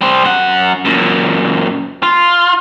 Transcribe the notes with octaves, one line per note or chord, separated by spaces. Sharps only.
G3 C5
F#2 F#5
F#2 A#2
F4